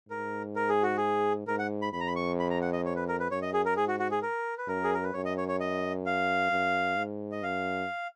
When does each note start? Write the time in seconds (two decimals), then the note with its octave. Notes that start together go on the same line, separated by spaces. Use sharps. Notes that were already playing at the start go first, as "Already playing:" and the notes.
0.09 G#2 A#4
0.56 A#4
0.69 G#4
0.83 F#4
0.97 G#4
1.47 G#2 A#4
1.59 F#5
1.82 B5
1.93 F2 B5
2.00 A#5
2.07 B5
2.16 C#6
2.39 B5
2.50 A#5
2.62 F#5
2.73 D#5
2.85 C#5
2.96 B4
3.08 A#4
3.20 B4
3.31 F#2 C#5
3.42 D#5
3.54 G#4
3.66 A#4
3.77 G#2 G#4
3.88 F#4
4.00 F#4
4.11 G#4
4.22 A#4
4.58 B4
4.68 F#2 A#4
4.84 G#4
4.94 A#4
5.04 B4
5.14 F#2 C#5
5.25 D#5
5.37 C#5
5.48 C#5
5.60 D#5
6.06 F5
6.51 F#2
6.97 G#2
7.32 D#5
7.43 F#2 F5